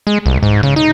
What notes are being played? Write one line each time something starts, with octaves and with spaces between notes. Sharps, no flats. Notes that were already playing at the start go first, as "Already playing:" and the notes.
G#3
C2
G#2
C#3
D#4